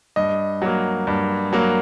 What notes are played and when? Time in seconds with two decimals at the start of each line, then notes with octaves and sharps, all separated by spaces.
0.16 G2 D#5
0.62 F#3 A#3
1.07 G2
1.53 F#3 A#3